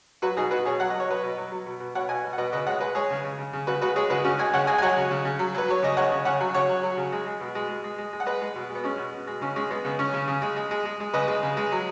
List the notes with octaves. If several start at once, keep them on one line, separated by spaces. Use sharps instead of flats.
F#3 F#4 B4
B2 D#4 G#4
B2 F#4 B4
B2 G#4 C#5
F#3 F#5
F#3 D#5
C#5
F#3 B4 D#5
B2
F#3
F#3
B2
B2
B2 C#5 F#5
B2 D#5 G#5
B2
F#5
B2 B4 D#5
C#3 B4 D#5
G#3 C#5 F#5
G#3 B4 D#5
G#3 G#4 C#5
C#3
C#3
C#3
C#3
C#3 F#4 B4
G#3 F#4 B4
G#3 G#4 C#5
C#3 F#4 B4
C#3 C#4 F#4
G#3 D#5 G#5
C#3 C#5 F#5
G#3 D#5 G#5
G#5
F#3 C#5 F#5
C#3
C#3
C#3
F#3
F#3 B4
F#3 C#5
C#3 D#5
C#3 C#5 F#5
C#3
C#3 C#5 F#5
F#3
C#3 C#5 F#5
F#3
F#3
C#3
G#3
G#3
B2
G#3
G#3
G#3
G#3
G#3
F#5
G#3 B4 D#5
G#3
B2
G#3
B3
G#3 C#4
B2
B2
G#3
C#3 C#4
G#3 C#4
G#3 B3
C#3 B3
C#3 C#4
C#3
C#3
G#3
G#3
G#3
G#3
G#3
C#3 B4 D#5
G#3
C#3
G#3
F#3